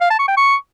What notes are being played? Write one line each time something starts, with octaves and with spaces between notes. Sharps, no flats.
F5
A5
C#6
G5
C#6